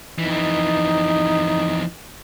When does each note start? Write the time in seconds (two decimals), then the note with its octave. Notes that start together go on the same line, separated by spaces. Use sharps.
0.19 F2 E3 D#4